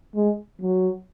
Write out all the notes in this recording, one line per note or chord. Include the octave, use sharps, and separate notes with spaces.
G#3
F#3